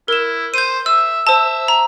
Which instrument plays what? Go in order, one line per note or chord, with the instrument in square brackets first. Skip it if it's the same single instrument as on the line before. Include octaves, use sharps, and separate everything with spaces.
[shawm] E4 [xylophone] A#4 E7
[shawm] C5 [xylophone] G6 D#7
[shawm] E5 [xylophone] E6
[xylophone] C5 A5 [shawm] E5
[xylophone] A#5